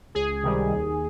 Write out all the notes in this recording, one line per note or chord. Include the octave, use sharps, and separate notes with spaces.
C#2 G#4
C3 D#3 G3
D#2